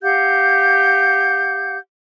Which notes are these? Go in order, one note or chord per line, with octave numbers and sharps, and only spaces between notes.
G4 F5 F#5 G6